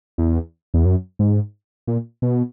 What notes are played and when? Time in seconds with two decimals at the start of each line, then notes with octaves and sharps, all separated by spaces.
0.18 E2
0.74 E2
0.85 F#2
1.19 G#2
1.87 A#2
2.22 B2